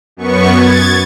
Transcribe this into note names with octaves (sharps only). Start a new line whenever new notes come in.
F#2 B3 C#6
G#6 A6